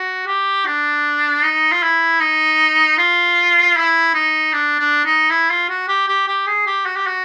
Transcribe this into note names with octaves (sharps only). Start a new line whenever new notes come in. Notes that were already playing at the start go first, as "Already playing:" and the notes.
Already playing: F#4
G4
D4
D#4
F4
E4
D#4
F4
E4
D#4
D4
D4
D#4
E4
F4
F#4
G4
G4
G4
G#4
G4
F#4
G4
F#4